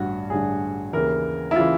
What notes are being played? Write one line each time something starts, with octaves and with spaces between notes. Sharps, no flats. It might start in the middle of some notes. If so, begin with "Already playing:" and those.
Already playing: A1 G2 D3 F#4
A1 G2 D3 G#4
D#2 C#3 E3 A#4
E4
C#3 E3 F4